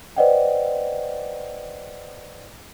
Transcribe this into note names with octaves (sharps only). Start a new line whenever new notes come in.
B4 C5 D5 D#5 F#5 G5